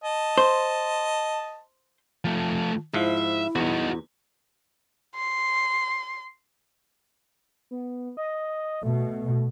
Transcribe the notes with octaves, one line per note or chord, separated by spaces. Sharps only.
D#5 A5
C5
F3 A3
G#2 F3 E4 E5
E2 D#4 F#4
C6
B3
D#5
B2 A3